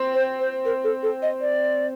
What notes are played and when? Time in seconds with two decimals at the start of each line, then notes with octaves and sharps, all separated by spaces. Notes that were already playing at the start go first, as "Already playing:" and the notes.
Already playing: C4
0.14 C5
0.40 C5
0.65 A#4
0.84 A4
1.03 A4
1.22 D#5
1.41 D5